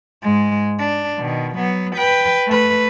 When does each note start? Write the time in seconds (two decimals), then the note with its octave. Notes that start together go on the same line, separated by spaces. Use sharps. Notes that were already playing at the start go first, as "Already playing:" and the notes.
0.22 G#2 G#3
0.79 D4
1.19 B2 D#3
1.56 F#3 B3
1.96 B4 G5
2.47 A3 B4